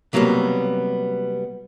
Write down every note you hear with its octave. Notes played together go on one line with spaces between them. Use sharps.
C3 F#3 G3 A#3 B3